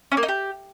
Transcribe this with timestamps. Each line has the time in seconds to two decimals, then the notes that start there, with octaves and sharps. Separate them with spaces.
0.12 C#4
0.17 A#3
0.23 D#4
0.28 G4